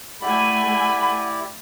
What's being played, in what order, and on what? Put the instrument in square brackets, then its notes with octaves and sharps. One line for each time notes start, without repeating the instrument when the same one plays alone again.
[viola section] A3 G#5 [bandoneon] E4 G4 D5 [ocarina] F#5 [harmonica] B5